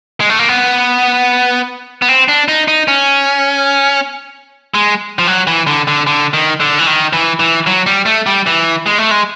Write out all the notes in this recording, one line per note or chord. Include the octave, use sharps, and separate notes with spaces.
G#3
A3
A#3
B3
B3
C4
D4
D#4
D#4
C#4
G#3
F3
F#3
E3
D3
D3
D3
D#3
D3
E3
D#3
E3
E3
F#3
G3
A3
G3
E3
G#3
A3
G#3